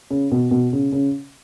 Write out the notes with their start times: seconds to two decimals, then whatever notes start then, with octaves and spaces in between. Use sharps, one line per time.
0.10 C#3
0.32 B2
0.51 B2
0.73 C#3
0.92 C#3